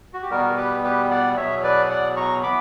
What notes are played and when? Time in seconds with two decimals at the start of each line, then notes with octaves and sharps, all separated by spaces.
0.14 F#4
0.23 G4
0.30 E2 B2 G3 B3 F#4 A#4
0.57 G4 B4
0.84 G4 B4
1.11 D5 F#5
1.37 E2 B2 F#3 C#5 E5
1.63 B4 D5
1.90 D5 F#5
2.17 A#5 C#6
2.43 E3 B3 B5 D6